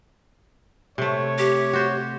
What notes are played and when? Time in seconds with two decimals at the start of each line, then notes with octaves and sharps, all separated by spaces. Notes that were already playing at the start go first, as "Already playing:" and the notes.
0.98 C3 A3 C#5
1.38 G4
1.73 F#4 C5